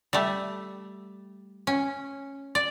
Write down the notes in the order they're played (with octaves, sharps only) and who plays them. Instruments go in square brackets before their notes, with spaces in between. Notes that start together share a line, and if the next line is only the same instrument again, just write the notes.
[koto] G3 A3
C#4
D5